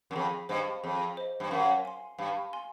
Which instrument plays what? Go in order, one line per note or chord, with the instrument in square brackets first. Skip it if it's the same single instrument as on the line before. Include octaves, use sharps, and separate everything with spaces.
[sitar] F#2
[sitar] F2 [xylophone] G#4
[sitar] G2 [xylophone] C5 D#5
[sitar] F2 [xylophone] G#4
[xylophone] C5 D#5
[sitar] G2
[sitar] F#2 [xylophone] F5
[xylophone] G#5 C6
[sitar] G2 [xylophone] F5
[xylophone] G#5 C6